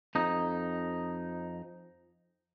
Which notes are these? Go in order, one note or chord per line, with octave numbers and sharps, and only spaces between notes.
F2 D#4